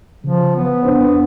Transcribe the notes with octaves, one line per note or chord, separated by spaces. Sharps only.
C#3 F3
B3
F2 D4 C5
B3